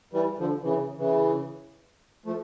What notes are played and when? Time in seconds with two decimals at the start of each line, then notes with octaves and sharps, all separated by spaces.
0.13 E3 G3
0.39 D3 F3
0.63 C#3 E3
0.98 C#3 E3
2.26 F3 A3